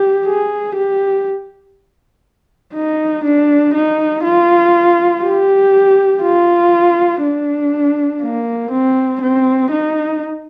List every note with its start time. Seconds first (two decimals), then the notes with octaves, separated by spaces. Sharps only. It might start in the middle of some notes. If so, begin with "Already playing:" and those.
Already playing: G4
0.26 G#4
0.76 G4
2.74 D#4
3.24 D4
3.74 D#4
4.23 F4
5.23 G4
6.22 F4
7.22 D4
8.22 A#3
8.71 C4
9.21 C4
9.71 D#4